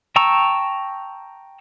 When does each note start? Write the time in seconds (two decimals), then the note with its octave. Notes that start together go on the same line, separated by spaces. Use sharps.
0.16 G5 A5 A#5 C#6 E6